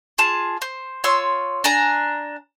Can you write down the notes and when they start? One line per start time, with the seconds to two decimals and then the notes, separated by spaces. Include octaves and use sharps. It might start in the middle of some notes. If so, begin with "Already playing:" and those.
0.18 F4 G#4 A5
0.62 C5
1.04 F4 C#5 C6 E6
1.64 D4 G#5 A#5